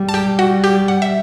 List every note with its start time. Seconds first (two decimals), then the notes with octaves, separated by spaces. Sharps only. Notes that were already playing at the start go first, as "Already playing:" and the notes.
Already playing: G3
0.09 A5
0.14 G4 G5
0.39 F#4 F#5
0.64 G4 G5
0.88 F#5
1.02 E5